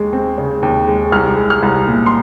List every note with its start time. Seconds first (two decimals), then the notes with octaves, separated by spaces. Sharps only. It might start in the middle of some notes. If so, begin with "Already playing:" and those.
Already playing: D#2 G#3
0.13 C4
0.38 C#3
0.62 D#2
0.88 G#3
1.12 C2 F6
1.37 G#3
1.50 F6
1.63 C2
1.88 A#2
2.06 C6